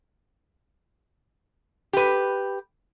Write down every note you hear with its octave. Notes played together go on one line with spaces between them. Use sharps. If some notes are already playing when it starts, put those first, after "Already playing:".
G4 B4